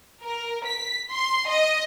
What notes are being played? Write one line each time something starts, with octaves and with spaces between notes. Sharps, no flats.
A#4
B6
C6
D#5